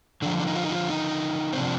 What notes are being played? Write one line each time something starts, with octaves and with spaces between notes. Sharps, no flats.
D3 F3 D4
D4
D#4
F4
D#4
F4
D#4
C4
C3 F3 D4